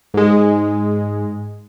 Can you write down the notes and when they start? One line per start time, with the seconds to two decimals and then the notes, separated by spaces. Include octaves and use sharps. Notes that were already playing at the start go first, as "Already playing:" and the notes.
0.14 G#2 G#3